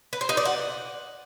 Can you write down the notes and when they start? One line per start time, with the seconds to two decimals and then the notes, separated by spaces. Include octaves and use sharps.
0.13 B4
0.21 C5
0.29 D#4
0.37 D5
0.45 F#5